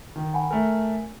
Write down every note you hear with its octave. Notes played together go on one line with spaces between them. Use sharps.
D#3
F#5 G#5 B5
A3 A#4 G#5